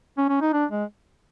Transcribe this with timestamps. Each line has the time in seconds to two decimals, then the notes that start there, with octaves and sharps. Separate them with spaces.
0.18 C#4
0.29 C#4
0.41 D#4
0.53 D4
0.71 G#3